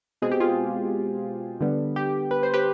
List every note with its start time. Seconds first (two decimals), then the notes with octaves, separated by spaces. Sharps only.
0.22 B2 G#3 C4 G#4
0.32 G4
0.40 F4 G#4
1.61 D3 G3 B3
1.96 G4
2.31 B4
2.43 C5
2.54 G4 B4